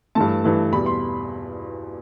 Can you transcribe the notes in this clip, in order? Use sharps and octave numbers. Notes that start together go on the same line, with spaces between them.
G2 E3 A3 A5
G2 E3 A3
E2 B2 G3 B5
C6